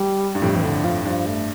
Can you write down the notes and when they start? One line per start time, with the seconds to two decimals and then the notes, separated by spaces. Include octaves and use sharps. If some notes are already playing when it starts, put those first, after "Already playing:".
Already playing: G3
0.35 G2
0.42 F2 A2 G3
0.56 E3
0.63 D3
0.84 F3
1.04 G2 F3
1.26 A3